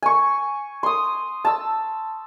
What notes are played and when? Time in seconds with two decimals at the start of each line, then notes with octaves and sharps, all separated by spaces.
0.03 G#5 C#6
0.83 C6 D#6
1.45 A5 E6